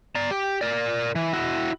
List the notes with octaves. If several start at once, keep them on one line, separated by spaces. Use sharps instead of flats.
D5 A#5
G4
A#4 D5
E3
E4 F#4